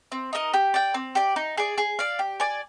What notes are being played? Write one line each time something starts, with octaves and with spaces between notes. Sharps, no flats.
C4
D#4 A#4 D#5
G4
D5 G5
C4
G4 D5
D#4
G#4 D5
G#4
D5 F5
G4
D5 G#5